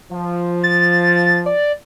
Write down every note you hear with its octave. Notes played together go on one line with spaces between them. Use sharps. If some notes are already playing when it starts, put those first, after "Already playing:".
F3
A6
D5